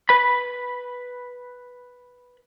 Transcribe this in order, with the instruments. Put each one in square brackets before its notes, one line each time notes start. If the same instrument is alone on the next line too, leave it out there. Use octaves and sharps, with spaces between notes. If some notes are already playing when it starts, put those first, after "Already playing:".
[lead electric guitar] B4 B5